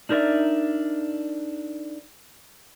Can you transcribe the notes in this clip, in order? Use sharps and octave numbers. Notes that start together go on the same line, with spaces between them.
D4 D#4 A#4 B4 D5 E5